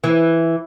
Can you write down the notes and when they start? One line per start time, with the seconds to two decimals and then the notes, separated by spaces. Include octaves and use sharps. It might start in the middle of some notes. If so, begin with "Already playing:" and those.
0.04 E3